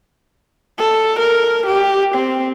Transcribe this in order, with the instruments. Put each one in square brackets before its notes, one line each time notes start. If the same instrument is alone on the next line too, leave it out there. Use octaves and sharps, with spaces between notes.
[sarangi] A4
A#4
G4
C4